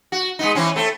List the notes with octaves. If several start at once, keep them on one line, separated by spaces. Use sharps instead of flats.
F#4
G#3 B3 D#4
E3 C4 C#4
A3 C4